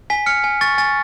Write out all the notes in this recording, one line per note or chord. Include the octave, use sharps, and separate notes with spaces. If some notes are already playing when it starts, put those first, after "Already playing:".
G#5 B6
F6 C#7
G#5
C#6 A6
G#5 A6